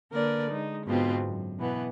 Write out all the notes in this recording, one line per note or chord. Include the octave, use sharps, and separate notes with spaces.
D3 A#3 A#4 B4 D5
G#3 D#4
G#2 B2 D3 B3 C4 F4
F#2
B2 E3 B3